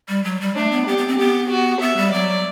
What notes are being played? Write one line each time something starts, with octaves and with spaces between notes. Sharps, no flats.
G3
F#3
G3
A3 D4
B3
B3 G4
B3
C4
B3 G4
F#4
B3 E5
G3
F#3 D5